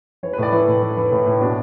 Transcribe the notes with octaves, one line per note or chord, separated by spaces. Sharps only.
E3 C#5
B4
A2 D5
E3 E4
A2
E3
E3
A2
A2
B2 D4